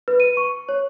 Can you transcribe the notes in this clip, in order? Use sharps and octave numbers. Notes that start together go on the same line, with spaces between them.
B4
D#7
C#6
C#5